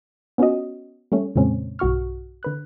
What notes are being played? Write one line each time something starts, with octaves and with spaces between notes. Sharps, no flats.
B3 C#4 F4 F#4 D#5
G3 A3 C#4
F2 A#2 C#3 G#3 C4 C#4
B1 G2 F#4 C#6 F6
D3 B4 F#6